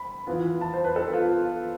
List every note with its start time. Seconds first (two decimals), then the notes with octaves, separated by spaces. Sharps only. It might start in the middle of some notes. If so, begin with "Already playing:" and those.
Already playing: B5
0.27 E3 B3 F4
0.61 A5
0.73 C5
0.84 B4
0.96 A4
1.13 F4